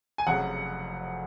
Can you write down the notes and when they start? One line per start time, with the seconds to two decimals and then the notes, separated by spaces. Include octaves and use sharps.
0.18 G#5
0.27 F1 F2 C#3 F#3 F#5